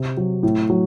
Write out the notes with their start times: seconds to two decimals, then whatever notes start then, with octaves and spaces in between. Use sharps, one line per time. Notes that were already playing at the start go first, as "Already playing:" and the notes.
Already playing: C3
0.17 F#3
0.43 A2
0.70 F#3